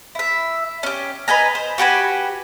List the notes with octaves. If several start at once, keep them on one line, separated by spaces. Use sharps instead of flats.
E4 E5
C#4 G4
B4 D#5 G#5 A#5
C5
F#4 G4 B4 G#5